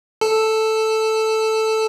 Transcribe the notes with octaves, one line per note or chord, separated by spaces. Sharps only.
A4